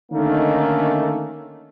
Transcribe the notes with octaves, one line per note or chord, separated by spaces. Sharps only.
D3 D#3 A3 A#3 C#4 D#4